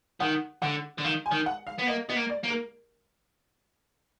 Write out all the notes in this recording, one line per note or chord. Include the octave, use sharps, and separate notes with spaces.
D#3 F#5
D3 F#5
D3
D#3 F5
G#5
D#3
F#5
F5
B3
A#3 D#5
B3 D#5
A#3
D5
A#3
A#4